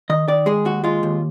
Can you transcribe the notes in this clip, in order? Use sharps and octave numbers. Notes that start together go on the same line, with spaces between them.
D#3 D#5
D#3 D5
G#3 G#4
D#2 F#4
G#3 F4
D#2